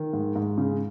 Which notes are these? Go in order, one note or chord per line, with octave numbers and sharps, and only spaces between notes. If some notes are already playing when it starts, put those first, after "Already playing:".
Already playing: D#3
G#2
G#2
C#3